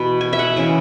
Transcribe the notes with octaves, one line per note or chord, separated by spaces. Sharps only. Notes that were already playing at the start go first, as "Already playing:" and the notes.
Already playing: B2 E3 B3 B5
G#5
E5
F#5
C#3 E3 G#3 G#5